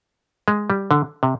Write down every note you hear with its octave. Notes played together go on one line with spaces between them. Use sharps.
G#3
G3
D3
C3